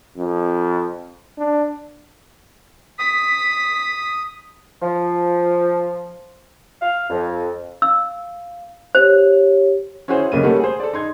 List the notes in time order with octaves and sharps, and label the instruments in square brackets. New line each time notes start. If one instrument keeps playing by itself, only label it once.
[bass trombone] F2
D4
[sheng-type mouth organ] D#6 [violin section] B6
[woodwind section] F3
F5
F2
[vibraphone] F5 [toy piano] E6
[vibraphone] G4 C#5 [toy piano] C5
[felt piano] C#4 E4 F#4 G#4 C5
B1 C#3 A#3 D#7
G3 A3 A#3 C#4 F#4 A4
G#4 C5
A4 D5
D#4 C6 G#6